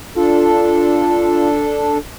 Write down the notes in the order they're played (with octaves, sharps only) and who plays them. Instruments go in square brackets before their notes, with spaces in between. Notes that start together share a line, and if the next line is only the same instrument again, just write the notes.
[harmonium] D4 A4 [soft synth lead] F4